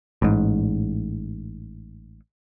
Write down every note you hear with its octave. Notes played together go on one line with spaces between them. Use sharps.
A1 G#2